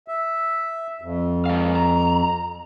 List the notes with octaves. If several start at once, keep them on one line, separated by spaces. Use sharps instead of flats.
E5
F2
G#3 F5
A#5